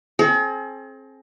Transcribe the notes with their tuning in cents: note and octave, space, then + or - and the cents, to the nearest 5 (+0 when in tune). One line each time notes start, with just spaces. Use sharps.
C4 +30 G#4 +45